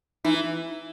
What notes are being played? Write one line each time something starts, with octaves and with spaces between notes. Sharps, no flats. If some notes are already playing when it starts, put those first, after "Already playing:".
E3 D#4